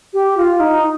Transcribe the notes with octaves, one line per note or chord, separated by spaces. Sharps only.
G4
F4
D#4